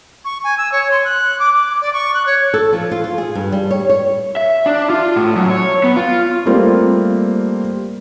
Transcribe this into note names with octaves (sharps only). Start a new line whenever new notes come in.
C#6
G#5
E6
C#5
C6
F#6
D6
D6
D5
C#6
F#6
C#5
A4
F3
F4
F4
G#4
G2
G3
C#5
C#5
E5
D4
F4
A2
F#2
C#5
B3
F4
G3 A3 A#3 C4 F4